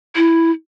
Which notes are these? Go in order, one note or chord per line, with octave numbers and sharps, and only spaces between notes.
E4